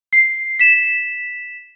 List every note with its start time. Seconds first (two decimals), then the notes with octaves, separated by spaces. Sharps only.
0.13 C7
0.59 B6 E7